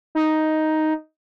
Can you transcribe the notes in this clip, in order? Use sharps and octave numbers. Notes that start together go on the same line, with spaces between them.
D#4